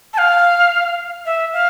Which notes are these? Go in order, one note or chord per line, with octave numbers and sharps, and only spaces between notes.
A5
F5
E5
F5